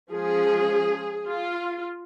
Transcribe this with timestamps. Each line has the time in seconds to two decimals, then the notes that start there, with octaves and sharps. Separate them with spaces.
0.11 F3 G#3 C#4 G#4
1.27 F4